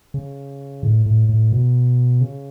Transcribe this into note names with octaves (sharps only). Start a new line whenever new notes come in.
C#3
A2
A2
A2
B2
C#3